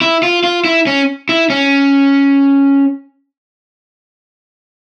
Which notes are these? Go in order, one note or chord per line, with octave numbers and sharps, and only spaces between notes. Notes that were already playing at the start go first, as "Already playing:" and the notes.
E4
F4
F4
E4
C#4
E4
C#4